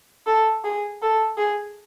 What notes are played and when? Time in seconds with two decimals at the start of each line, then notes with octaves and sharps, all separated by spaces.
0.27 A4
0.64 G#4
1.02 A4
1.38 G#4